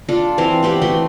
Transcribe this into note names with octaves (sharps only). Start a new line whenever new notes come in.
D4 F4 A4
E3 C4 F5
B3 C4 G4 B4
E3 A3 F#4 C6